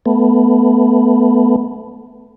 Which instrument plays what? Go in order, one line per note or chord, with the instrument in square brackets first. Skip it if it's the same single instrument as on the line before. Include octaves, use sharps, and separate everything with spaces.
[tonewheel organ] A3 B3